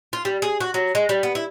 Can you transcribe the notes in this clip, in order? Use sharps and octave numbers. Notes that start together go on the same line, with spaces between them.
F4
G3
G#4
F#4
F#3
G#3
G3
B3
E4